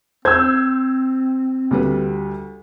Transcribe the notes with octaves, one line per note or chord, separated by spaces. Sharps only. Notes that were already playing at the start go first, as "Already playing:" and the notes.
C4 C5 E6 G6 G#6
D2 G3 B4